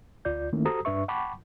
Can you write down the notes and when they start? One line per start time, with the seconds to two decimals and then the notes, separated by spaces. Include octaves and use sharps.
0.25 D2 F4 D5 G6
0.53 D#3 A3 A#3 C#4 E4
0.65 F#4 G4 A4 C5 A#5 D#6
0.85 G2 D4 B4 E5 C#6
1.08 F#5 G5 A5 B5 C#6 D6